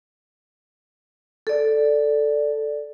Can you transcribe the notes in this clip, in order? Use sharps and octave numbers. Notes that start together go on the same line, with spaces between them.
A4 D5